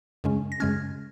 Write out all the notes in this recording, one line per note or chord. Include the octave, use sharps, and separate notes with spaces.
F#2 C#3 G#3 C#4
A#6
F#2 C#3 G#3 C#4 F6 G#6